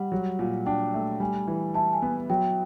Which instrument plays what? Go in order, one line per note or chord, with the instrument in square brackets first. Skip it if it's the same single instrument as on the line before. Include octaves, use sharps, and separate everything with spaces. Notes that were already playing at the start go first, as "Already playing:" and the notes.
Already playing: [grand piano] G3 [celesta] F#5
[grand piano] F#3
A#2
[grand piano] D4 [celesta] G5
[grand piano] A3
[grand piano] G3 [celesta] G#5
[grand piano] E3
[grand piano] E4 [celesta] A5
[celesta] G#5
[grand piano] B3
[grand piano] F#3 [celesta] G5